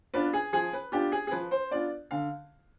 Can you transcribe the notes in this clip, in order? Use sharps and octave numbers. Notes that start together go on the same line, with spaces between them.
B3 D4 F4 B4
G#4
F3 G#4
B4
B3 D4 F4 G4
G#4
G#4
F3 B4
C5
B3 D4 F4 D5
D3 F5